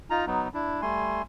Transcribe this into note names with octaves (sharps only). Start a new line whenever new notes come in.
D#4 F4 A#5
F#3 B3 D#4
D4 E4
G3 A3 G#5 C6